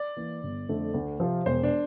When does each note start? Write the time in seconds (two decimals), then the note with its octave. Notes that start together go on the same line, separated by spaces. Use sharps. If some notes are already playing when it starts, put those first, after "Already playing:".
Already playing: D5
0.17 E3 A#3 E4
0.43 G1
0.69 F2 D3 A3
0.94 D2
1.20 C3 F3 C4 F4
1.46 E1 C5
1.63 D4